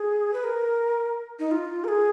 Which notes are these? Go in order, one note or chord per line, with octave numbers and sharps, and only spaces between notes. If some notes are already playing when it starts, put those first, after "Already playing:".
Already playing: G#4
B4
A#4
D#4
F4
A#4
G#4